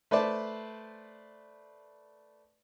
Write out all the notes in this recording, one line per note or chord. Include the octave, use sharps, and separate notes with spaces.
A3 B4 C5 D5 A5